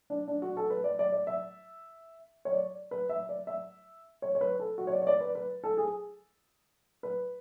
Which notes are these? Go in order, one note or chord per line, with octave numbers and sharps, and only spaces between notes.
D4
D4
F#4
A4
B4
D5
D5
D5
E5
C#5
D5
B4
E5
D5
E5
C#5
C#5
B4
A4
F#4
C#5
D5
C#5
D5
B4
B4
A4
G#4
B4